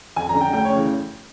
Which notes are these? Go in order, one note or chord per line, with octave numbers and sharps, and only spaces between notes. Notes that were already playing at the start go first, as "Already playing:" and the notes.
F2 G#5
A#5
D3
G5
D2 G5
C#5
C#3 E3